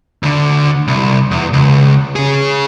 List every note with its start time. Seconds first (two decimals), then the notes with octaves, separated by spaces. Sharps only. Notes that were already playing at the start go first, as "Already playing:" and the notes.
0.23 D2 D3
0.88 C2
1.31 E2
1.53 C#2
2.16 C#4 G#4